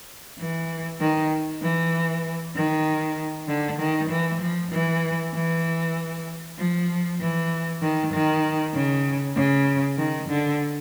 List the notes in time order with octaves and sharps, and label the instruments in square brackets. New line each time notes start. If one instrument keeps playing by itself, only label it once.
[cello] E3
D#3
E3
D#3
D3
D#3
E3
F3
E3
E3
F3
E3
D#3
D#3
C#3
C#3
D#3
D3